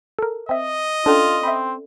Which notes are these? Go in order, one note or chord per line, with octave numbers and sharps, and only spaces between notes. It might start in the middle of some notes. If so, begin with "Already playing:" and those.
A4 A#4
C4 D#5 E5
C#4 D4 F4 A4 D5
C4 E5 B5